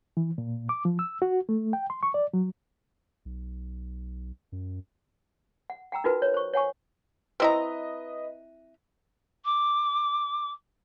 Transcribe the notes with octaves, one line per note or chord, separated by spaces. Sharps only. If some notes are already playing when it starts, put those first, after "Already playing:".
E3
A#2
D6
F3
E6
F#4
A3
G5
C6
C#6
D5
F#3
B1
F#2
F#5
F#5 G5 A#5 E6
D#4 F4 F#4 A#4 B4
C#5
C5 C#6
C#5 F#5 G#5 C#6
C4 E4 B4 D#5 A#5
D6